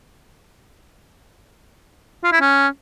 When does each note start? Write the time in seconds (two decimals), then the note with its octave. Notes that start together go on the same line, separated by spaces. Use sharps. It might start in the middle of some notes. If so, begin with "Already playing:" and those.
2.23 F4
2.32 E4
2.41 C#4